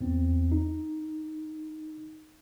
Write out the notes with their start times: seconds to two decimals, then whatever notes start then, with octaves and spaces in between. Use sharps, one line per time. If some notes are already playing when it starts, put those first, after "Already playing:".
0.01 E2 C4
0.52 D#4